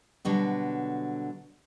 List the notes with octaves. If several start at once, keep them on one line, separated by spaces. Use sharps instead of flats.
B2 D3 F#3 G3